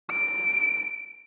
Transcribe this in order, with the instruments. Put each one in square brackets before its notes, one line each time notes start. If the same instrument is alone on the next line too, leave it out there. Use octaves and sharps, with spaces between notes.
[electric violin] D7